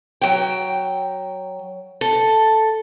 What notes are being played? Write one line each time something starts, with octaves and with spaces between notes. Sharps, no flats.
F#3 G5
A4